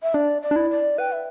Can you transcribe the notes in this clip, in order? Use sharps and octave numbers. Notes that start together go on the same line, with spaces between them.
E5
D4 D5
D5
D4
E4
D5
B4 G5
E5